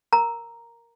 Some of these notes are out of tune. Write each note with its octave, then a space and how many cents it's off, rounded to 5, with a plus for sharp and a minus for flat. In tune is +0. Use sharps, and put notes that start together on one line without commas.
A#4 +0 A#5 +0